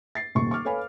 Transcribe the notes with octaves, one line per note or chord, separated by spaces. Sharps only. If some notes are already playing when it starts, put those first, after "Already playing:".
A6 C7
D#1 D#2 C#6
C#6 D6 F6
A4 B4 C#5 F5 G#5 B5